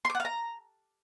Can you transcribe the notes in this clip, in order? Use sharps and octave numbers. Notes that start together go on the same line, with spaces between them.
C6
D6
F#5
F5
A#5